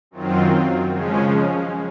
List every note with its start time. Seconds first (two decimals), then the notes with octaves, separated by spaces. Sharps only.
0.11 F#2 D#3 F#3 C4 F4
0.90 C#3 F3 G#3 C#4